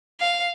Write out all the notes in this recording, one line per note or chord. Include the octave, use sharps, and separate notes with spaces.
F5